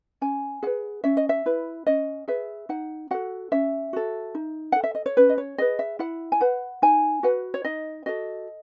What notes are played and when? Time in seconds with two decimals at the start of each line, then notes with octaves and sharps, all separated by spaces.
0.21 C#4 G#5
0.63 G#4 B4 F#5
1.04 C#4 E5
1.17 D#5
1.29 E5
1.46 E4 B4
1.87 C#4 D#5
2.28 G#4 B4 E5
2.69 D#4 F#5
3.11 F#4 A4 F#5
3.52 C#4 E5
3.93 F#4 A4
4.35 D#4
4.72 A4 F#5
4.84 E5
4.95 D#5
5.06 C#5
5.17 C#4 B4
5.29 D#5
5.38 C#5
5.58 G#4 B4 D#5
5.79 E5
5.99 E4 F#5
6.32 G#5
6.41 B4 F#5
6.82 D#4 G#5
7.23 F#4 B4 F#5
7.54 C#5
7.65 D#4 D#5
8.06 F#4 A4 D#5